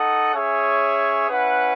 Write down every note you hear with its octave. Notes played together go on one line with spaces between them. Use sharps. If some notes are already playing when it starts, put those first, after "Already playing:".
Already playing: D#4 A4 D#5 F#5
C#4 G#4 C#5 E5
C#4 E4 B4 F#5